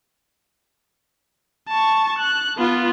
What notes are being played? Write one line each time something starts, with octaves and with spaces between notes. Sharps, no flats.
A5 C#6
F#6
B3 F4